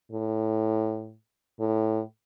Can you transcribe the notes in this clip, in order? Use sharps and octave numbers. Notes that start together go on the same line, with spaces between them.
A2
A2